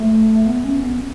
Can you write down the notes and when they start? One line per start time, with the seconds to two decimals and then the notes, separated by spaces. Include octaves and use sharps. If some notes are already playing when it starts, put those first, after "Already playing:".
Already playing: A3
0.46 B3
0.65 C#4
0.83 B3